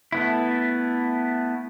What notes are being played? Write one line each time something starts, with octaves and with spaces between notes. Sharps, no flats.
A3 B3 E4